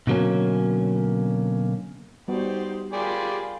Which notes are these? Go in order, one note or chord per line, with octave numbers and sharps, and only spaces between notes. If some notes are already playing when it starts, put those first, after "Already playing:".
B2 D3 F#3 A#3 C#4
G3 B3 D#4 F#4 G4 C5 D5
F4 G4 G#4 A#4 D5 B5 C6